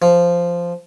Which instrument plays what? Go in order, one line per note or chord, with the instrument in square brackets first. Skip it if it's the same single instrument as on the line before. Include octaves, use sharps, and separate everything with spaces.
[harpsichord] F3